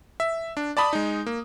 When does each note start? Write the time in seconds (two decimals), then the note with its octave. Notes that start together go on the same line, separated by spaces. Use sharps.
0.20 E5
0.57 D4
0.77 D5 A5 B5 D#6
0.93 G#3 D#4
1.26 A#3